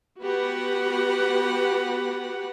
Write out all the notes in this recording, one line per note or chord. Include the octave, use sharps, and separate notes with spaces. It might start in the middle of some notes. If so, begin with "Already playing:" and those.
B3 F#4 G4 B4 F#5